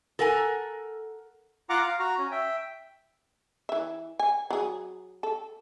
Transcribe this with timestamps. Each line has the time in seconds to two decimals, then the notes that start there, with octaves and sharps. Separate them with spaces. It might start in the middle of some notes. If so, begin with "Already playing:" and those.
0.19 A4 A#4 F#5 G#5
1.70 F4 F#5 A#5 D6
1.83 F5
1.99 F#4 A#5
2.18 C#4
2.31 E5 G5
3.69 E3 E5
4.19 G#5
4.50 F#3 G#4
5.23 A4